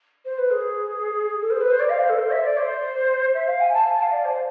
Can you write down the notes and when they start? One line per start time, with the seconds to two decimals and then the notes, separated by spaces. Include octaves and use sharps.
0.25 C5
0.38 B4
0.52 G#4
1.42 A4
1.50 C5
1.61 B4
1.70 C5
1.79 D5
1.89 F5
1.99 C5
2.09 A4
2.18 C5
2.31 E5
2.44 D5
2.57 C5
3.34 E5
3.47 F5
3.60 G#5
3.74 A5
3.83 G#5
3.92 A5
4.02 F5
4.11 D5
4.25 C5